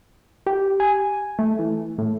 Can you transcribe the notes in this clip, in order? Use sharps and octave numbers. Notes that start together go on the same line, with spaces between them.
G4
G#5
A3
E3
A2